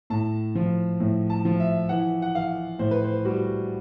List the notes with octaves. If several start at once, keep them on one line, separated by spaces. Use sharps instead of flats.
A2 A5
F3
A2
A5
F3
E5
E3 F#5
F#5
E3 F5
A2 C5
B4
C5
G3 F#4